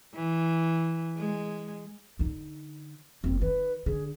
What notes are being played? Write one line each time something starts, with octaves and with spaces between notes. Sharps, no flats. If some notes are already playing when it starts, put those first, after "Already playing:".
E3
G#3
D3 D#4
F#1 F2 C4
D#3 B4
D3 G#4